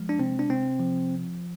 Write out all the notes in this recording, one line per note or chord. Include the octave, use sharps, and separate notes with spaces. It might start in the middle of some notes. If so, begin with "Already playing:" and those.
Already playing: F3 G#3
D4
C3 C4
D4
C3 C4
F3